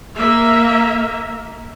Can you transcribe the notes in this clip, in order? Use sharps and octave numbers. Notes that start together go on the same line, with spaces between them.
A#3 E5